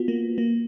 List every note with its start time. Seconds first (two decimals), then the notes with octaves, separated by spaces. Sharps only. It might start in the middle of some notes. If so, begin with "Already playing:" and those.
Already playing: B3 F4 F#4
0.08 A#3
0.38 A#3